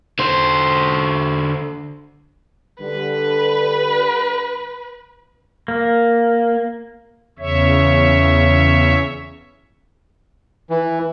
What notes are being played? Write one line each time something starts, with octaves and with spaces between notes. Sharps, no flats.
D3 C5
D3 G3 B4
A#3
E2 C#3 C#5 E5
E3